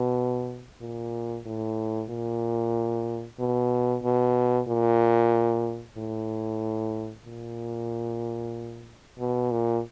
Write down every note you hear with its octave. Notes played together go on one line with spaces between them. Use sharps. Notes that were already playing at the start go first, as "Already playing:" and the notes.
Already playing: B2
A#2
A2
A#2
B2
B2
A#2
A2
A#2
B2
A#2